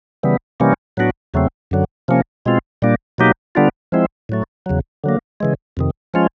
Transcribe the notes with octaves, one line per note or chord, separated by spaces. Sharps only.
C#3 E3 G3 B3
C3 E3 G3 A#3 C#4
A2 F#3 B3 D4 F#4
E2 C#3 F#3 A3 C4
F#2 D3 F#3
C3 F3 A#3 C#4
B2 G#3 C4 F4
A#2 G3 A#3 D4
B2 F#3 A#3 D#4 G4
D3 G3 B3 D4 F4
F3 G#3 C4 E4
A2 F#3 A3
E2 C#3 F#3
D3 F#3 A#3
C#3 E3 G#3
F2 C3 D#3
F3 G#3 C#4 F4